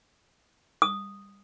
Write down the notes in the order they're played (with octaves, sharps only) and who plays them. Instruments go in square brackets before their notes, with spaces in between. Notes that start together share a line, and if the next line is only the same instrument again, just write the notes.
[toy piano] D#6